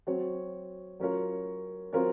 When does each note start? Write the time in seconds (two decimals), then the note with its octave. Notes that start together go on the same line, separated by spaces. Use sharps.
0.07 F#3 C4 F#4 C#5
1.00 F#3 C#4 F4 A#4 C#5
1.93 F#3 C4 F4 A#4 C#5